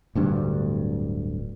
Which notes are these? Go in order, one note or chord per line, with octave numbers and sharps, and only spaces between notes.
D1 D2 G2